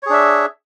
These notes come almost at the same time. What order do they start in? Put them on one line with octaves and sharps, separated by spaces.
C#5 G#4 D4 E5